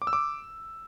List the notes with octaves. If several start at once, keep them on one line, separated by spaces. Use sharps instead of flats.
D6
E6
D6